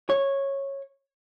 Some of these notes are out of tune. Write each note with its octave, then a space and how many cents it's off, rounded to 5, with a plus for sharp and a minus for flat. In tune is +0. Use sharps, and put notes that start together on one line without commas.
C#5 -10